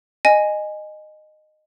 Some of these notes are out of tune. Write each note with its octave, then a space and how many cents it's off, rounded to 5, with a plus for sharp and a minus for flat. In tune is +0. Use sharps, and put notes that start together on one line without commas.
D#5 -15 G#5 +0